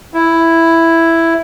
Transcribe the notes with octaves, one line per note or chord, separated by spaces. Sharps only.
E4